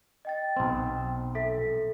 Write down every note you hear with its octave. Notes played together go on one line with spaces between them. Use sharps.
D#5 G5 A6
B1 C4
A4 E5 B6